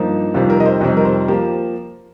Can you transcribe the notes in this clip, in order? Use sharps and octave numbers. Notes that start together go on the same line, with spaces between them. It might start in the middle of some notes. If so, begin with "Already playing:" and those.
Already playing: G2 F3 A#3 D#4
F2 C3 D#3 G3 C4 F4
A#4
D#5
C5
F2 C3 D#3 G3 C4 D#5
A#4
C5
F3 A#3 G4